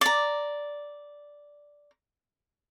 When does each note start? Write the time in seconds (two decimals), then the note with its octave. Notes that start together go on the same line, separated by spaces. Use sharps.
0.01 D5 A#5